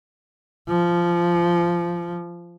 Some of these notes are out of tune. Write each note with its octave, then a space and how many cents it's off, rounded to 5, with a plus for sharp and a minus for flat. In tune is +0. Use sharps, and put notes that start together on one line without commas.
F3 -15